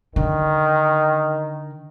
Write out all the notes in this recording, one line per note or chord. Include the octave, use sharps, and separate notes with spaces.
D3 D#3